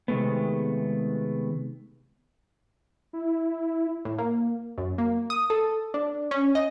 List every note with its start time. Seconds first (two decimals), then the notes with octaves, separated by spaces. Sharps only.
0.08 C3 D#3 G#3 A3 B3
3.13 E4
4.05 A2
4.18 A#3
4.78 F#2
4.98 A#3
5.30 D#6
5.50 A4
5.94 D4
6.31 C#4
6.55 D#5